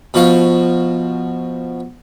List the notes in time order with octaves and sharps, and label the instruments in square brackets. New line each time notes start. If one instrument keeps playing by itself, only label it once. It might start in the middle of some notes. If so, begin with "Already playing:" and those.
[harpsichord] B2 F3 F#4 F5